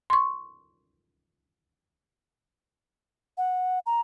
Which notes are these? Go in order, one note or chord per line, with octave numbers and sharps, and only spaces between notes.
C6 C#6
F#5
A#5